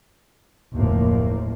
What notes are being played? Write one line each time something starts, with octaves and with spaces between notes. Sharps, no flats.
F#1 D#2 A2 F3 A#3